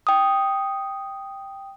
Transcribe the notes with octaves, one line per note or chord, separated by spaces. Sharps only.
G5 D#6